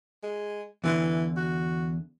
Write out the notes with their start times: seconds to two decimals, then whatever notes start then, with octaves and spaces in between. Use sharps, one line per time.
0.23 G#3
0.84 E2 D3 E3
1.36 F#4